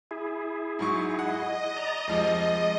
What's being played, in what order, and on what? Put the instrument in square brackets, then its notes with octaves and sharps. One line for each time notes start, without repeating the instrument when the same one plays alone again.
[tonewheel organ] E4 G#4
[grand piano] G#2 F#3 C#6
[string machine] D#5 [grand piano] F#5
[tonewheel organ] D5 A#5
[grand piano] F1 F3 [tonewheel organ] G#3